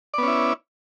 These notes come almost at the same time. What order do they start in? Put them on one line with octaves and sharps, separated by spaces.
D5 B3 C#4 E4